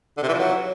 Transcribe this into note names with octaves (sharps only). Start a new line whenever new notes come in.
D3
C3
E3
F3
F#3